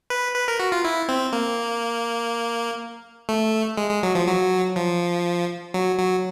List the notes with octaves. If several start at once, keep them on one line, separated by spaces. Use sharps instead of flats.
B4
B4
A#4
F#4
F4
E4
C4
A#3
A3
G#3
G#3
F#3
F3
F#3
F3
F#3
F#3